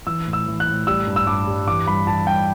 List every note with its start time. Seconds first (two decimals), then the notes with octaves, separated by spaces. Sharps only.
0.07 E3 E6
0.27 A2
0.33 E6
0.48 E3
0.60 F#6
0.67 A2
0.87 G3 E6
1.07 G2
1.16 E6
1.26 G2 D6
1.47 G3
1.67 E3 D6
1.87 G2 B5
2.07 E3 A5
2.27 G2 G5